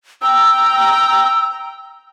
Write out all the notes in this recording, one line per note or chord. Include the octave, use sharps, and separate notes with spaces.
G5 A#5 E6